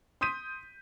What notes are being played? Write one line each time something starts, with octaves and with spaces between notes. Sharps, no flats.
C6 D#6 G6 B6 D#7